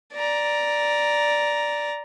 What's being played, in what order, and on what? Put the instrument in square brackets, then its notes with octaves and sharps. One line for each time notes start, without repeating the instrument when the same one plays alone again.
[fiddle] D5 A#5